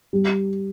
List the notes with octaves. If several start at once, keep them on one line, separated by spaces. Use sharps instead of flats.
G3